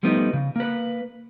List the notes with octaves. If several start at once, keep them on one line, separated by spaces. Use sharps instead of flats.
F3 G3 A3 B3 D#4
C#3
A#3 B4